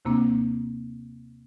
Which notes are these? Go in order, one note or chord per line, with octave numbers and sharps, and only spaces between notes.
D#2 C3 A#3 C4 D4